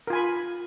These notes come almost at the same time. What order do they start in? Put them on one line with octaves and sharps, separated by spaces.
A#4 F4 G#5 B5